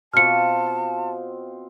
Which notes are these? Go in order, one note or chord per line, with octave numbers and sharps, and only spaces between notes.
B2 C4 F4 A5 F6 C#7